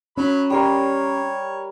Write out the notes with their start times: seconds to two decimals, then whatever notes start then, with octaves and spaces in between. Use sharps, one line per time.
0.18 F#3 C#4 B5
0.50 G3 A#4 C#5 C6